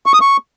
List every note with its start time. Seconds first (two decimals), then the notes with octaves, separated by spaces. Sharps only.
0.06 C#6
0.14 D#6
0.21 C#6